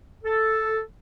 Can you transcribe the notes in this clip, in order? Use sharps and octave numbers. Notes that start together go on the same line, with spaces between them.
A4